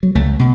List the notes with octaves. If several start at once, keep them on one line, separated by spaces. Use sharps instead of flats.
F#3
C#2 A3
B2